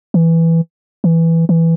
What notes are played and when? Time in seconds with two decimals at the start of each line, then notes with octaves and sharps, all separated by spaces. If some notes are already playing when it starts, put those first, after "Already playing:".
0.14 E3
1.04 E3
1.49 E3